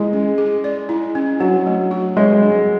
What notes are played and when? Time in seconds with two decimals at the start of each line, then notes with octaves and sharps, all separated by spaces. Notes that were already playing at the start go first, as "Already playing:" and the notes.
Already playing: G#3 E4
0.13 C#4
0.38 G#4
0.64 D5
0.89 E4
1.15 C#4
1.40 F#3 D4
1.66 A3
1.91 F#4
2.17 G#3 C#5
2.43 D4